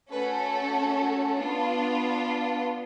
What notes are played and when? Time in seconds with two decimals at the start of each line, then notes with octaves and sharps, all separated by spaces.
0.11 A3 C#4 F#4 A4 B4
1.38 B3 D4 F4